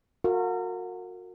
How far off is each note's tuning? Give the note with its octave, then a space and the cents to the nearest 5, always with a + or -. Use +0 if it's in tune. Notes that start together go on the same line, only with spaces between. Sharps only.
F#4 -30 A#4 -35 F5 +0